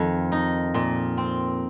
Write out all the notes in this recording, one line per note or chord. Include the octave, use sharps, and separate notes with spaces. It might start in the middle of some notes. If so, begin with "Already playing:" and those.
Already playing: F2 D#3
D#4
A#2
C4